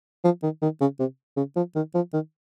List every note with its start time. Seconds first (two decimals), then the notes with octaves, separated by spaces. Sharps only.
0.24 F3
0.43 D#3
0.62 D#3
0.81 C#3
0.99 C3
1.37 C#3
1.56 F3
1.76 D#3
1.95 F3
2.13 D#3